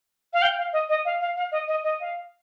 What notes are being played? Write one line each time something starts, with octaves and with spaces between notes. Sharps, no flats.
F5
G5
F5
D#5
D#5
F5
F5
F5
D#5
D#5
D#5
F5